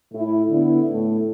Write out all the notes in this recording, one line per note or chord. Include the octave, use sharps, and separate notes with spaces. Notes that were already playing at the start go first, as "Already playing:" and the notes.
A2 A3 E4
D3 B3 E4
A2 A3 E4